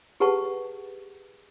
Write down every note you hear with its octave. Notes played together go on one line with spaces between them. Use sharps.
G4 G#4 B4 F#5 A5 C#6